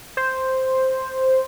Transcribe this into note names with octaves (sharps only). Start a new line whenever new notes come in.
C5